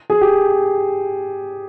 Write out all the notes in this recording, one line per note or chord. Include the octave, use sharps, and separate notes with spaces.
G#4
G4